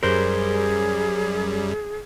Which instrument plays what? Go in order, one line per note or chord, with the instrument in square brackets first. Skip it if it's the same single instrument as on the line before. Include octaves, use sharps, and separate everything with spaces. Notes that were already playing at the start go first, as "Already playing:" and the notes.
[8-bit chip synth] F#2 G3 [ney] G#4 [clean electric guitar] A#4 C5